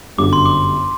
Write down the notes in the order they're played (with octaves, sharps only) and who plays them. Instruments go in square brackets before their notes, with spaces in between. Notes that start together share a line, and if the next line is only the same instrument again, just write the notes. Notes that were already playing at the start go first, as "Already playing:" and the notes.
[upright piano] G1 F#2 D3 G3 [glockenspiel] D6
[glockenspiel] C6
D6